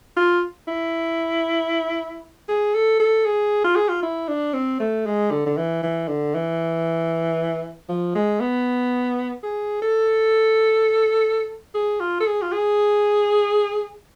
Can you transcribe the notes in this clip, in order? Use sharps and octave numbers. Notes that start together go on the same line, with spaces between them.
F4
E4
G#4
A4
A4
G#4
F4
G#4
F4
E4
D4
C4
A3
G#3
D3
D3
E3
E3
D3
E3
F3
G#3
B3
G#4
A4
G#4
F4
A4
G#4
F4
G#4